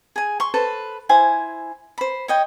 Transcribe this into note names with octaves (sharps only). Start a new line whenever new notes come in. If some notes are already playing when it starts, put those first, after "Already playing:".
G#4 G#5
C6 C#6
A4 B4 C5
E4 C5 G#5
C5 B5
C#5 D#5 G5